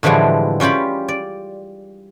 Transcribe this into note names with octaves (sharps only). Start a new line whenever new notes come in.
A2 D3 E3 F3 G3 G#3
G3 C#4 F4 G4 B5
D5